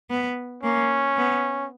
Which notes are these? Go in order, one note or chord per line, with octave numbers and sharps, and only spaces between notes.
B3
A#3 C#4
B3